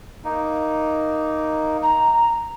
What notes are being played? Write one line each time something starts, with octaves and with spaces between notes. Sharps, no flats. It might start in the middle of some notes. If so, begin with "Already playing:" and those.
A#3 D#4
A#5